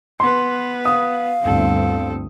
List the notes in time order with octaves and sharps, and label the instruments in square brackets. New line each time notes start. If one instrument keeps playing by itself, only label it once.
[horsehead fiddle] B3 B4 [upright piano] C6
[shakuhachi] F5 [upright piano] D#6
[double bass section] G1 D2 G2 [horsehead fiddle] C4 A4